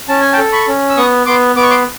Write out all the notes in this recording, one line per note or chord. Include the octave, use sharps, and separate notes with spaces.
C#4 A5
G#5
G5 A5
A4
B5 C#6
C#4
E6
B3 C#6 D#6
B3 C6 D6
B3 D6
C#6
C6 D6